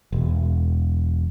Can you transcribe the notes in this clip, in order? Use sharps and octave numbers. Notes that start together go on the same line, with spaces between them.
E1